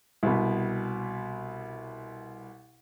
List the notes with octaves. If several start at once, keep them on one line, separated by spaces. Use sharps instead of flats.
C2 B2